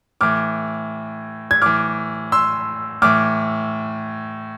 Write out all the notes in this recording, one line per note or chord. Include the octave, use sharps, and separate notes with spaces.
A2 E3 D6 F6
G#6
A2 E3 D6 F6
C6 E6
A2 E3 D6 F6